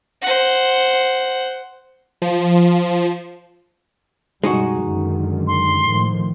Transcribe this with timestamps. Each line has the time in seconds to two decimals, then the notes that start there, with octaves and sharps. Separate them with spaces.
0.22 C5 F#5
2.22 F3
4.44 F#2 B2 G3 G#3 D#4 F#4
4.82 F#2 D3 D#3
5.47 C6
5.85 A2 D#3 F3